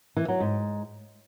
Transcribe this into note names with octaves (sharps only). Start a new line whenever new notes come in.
E3
F#3
G#2